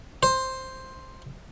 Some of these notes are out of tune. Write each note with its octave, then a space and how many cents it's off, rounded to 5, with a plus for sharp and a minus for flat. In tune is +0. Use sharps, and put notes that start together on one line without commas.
C5 +5